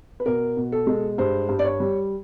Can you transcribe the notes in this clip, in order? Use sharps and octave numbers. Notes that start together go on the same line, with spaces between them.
B4
B2 A#4
B2
A4
G#3
G2 C5
G2
D5
C#5
G3